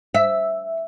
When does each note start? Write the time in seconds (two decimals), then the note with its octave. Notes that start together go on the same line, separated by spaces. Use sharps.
0.14 E5